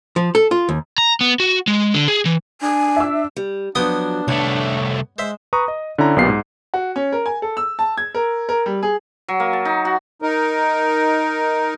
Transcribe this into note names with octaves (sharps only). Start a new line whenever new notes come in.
F3
A4
F4
D#2
A#5
B3
F#4
G#3
D3
G#4
E3
D4 G#5
E5 E6
G3
F3 F#3 B3 D4 G5 D#6
C2 A3 C#5
G#3 C5 E5
B4 A#5 C#6 D#6
D#5
D3 C#4 E4 A#5
B1 A#2 B3 F4 G4 C7
G#2
F#4
C#4
A#4
G#5
A4
E6
A5
G#6
A#4
A#4
G3
G#4
F#3
A#3
A5
D#4
F#4
D#4 A#4